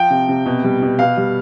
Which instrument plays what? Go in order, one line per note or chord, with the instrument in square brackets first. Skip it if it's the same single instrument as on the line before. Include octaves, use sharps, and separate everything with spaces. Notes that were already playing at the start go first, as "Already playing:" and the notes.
Already playing: [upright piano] F3 G5
C3
C3
B2
G3
B2
B2 F5
G3